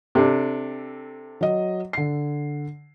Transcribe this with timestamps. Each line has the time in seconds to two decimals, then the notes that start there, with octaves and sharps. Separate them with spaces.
0.15 C3 D4 A4
1.41 F#3 D#5
1.93 D3 C7